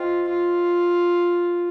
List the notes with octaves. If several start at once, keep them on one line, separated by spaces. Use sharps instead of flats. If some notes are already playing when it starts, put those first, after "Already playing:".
Already playing: F4 C5 D#5 G5
F4